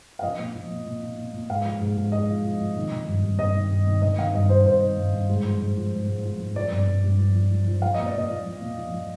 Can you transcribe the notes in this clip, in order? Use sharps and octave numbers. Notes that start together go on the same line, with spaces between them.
F5
F3 D#5
A#2
F3
A#2
A#2
A#2
A#2
A#2
G#2 F5
F3
G#2
G#2
G#2 D#5
F3
F3
F3
D#3
D#3
G2
G2
G2 D#5
D#3
G2
D#3
D#3 D#5
D#3 F5
G2 D#5
G2 C5
G2 C5
D#3
G2
G2
G#2
F3
G#2
F3
G#2
G#2
F3
G#2
F3 D5
G2
G2
G2
F3
F3
F3
F3
F3 F5
A#2 D#5
D5
A#2 D#5
F3
F3
A#2
F3
F3